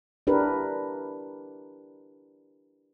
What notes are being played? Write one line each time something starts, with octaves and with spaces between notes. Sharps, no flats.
D4 E4 G4 A#4 B4